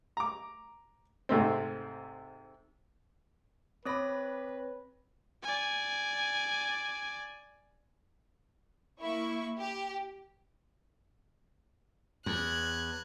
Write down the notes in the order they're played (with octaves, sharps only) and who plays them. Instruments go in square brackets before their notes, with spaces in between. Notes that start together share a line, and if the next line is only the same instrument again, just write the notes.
[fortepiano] A#5 D6
G#2 C3 A3 C4
[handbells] C4 C#5 A#6 [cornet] B4 [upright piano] B5 D6 D#6
[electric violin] D5 G#5
[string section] A#3 E4 C#6
G4
[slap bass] E2 [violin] F#6 G#6